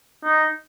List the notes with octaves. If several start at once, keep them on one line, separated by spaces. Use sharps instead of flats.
D#4